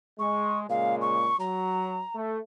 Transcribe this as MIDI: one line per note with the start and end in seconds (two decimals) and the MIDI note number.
0.19 0.65 56
0.19 0.58 85
0.69 1.31 46
0.69 1.31 49
0.69 1.31 56
0.69 0.95 77
1.01 1.36 85
1.39 2.02 54
1.39 2.16 82
2.14 2.39 57